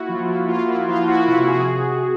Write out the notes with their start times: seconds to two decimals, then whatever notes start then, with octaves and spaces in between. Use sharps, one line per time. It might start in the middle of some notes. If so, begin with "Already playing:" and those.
Already playing: A#3 E4 F#4
0.08 F3 F4
0.28 F3 E4
0.48 A#3 F4
0.68 A#3 E4
0.88 F3 F4
1.07 F3 E4 F#4
1.27 C3 E4 F#4
1.47 C3 F#4 G#4
1.67 C3
1.87 C3